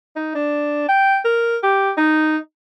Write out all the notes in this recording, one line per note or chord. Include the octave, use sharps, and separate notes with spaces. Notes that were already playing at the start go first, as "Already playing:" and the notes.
D#4
D4
G5
A#4
G4
D#4